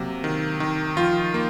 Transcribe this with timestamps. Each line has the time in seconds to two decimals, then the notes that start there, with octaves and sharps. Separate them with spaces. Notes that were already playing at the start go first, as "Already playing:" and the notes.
Already playing: C3 F#3 A#3
0.24 D#3
0.60 D#3
0.97 F3 F4
1.34 A#3